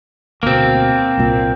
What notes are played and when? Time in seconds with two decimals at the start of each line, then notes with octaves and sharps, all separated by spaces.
0.43 D2 B2 A#3 C4
1.18 C2 A#2